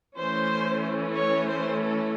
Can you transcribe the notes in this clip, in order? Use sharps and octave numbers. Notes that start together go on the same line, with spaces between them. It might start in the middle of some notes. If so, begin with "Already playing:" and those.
E3 A3 C#4 C5
C#5
C5
A4